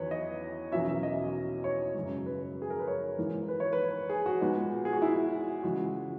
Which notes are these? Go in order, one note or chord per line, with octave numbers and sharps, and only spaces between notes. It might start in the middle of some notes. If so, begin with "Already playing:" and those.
Already playing: E2 D#3 F#3 B3 B4 C#5
D#5
E2 B2 F#3 A#3 C#4 E5
E5
D#5
C#5
F#2 C#3 G#3
B4
G#4
A#4
B4
C#5
G#2 E3 A#3
B4
C#5
B4
G#4
F#4
A#2 G#3 B3 D#4
G#4
F#4
E4
C#3 E3 G#3 F#4